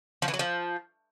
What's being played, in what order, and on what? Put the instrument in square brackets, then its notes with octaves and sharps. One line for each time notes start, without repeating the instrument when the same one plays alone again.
[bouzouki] F3
E3
F#3
F3